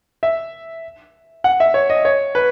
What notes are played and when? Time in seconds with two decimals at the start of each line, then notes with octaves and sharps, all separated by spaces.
0.23 E5
1.44 F#5
1.60 E5
1.74 C#5
1.90 D#5
2.05 C#5
2.35 B4